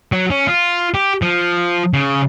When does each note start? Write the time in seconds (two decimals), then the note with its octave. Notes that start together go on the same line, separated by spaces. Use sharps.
0.12 F#3
0.30 C#4
0.47 F4
0.94 G4
1.22 F3
1.93 C#3